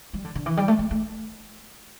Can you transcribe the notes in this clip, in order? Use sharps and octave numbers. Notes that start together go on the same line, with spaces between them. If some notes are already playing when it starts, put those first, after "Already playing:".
G3
D3
D3
E3
G3
A3
A3
A3